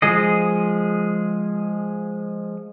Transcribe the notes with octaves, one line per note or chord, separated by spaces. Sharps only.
F3 G#3 G#4 D#5